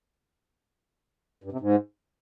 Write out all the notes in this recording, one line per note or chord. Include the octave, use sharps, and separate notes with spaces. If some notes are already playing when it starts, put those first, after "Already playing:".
G2
C3
G#2